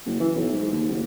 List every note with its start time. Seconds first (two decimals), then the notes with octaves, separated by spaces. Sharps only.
0.06 F#1
0.20 E3
0.35 B1
0.52 G#2
0.72 D#2
0.89 F#1